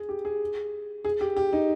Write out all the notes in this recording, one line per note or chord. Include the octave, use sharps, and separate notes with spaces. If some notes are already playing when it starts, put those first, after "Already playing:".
Already playing: G#4
G4
G#4
G#4
G4
G4
D#4